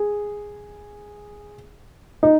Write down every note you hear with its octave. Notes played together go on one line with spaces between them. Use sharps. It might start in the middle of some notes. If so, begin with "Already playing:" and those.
Already playing: G#4
D#4